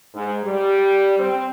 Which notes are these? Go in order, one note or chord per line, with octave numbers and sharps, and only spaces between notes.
G#2
G3
C4